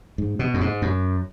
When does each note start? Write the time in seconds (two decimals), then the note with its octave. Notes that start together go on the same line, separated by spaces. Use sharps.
0.18 G#2
0.39 B2
0.54 F#2
0.61 G#2
0.82 F#2